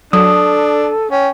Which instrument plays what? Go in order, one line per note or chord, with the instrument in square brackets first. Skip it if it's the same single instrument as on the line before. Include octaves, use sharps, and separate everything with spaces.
[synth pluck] F#3 [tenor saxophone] D4 [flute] A4 [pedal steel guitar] D#6
[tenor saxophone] C#4 [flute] G5